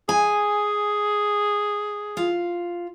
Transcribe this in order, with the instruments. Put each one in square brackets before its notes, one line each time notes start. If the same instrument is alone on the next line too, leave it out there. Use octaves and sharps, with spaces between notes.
[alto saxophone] G#4 [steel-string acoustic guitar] G#5
[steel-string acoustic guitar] F4